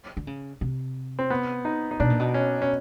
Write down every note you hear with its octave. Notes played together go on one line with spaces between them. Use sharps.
D3
C#3
C3
C4
B3
D#4
D#4
B2 D4
A#2
B2
C#4
C#4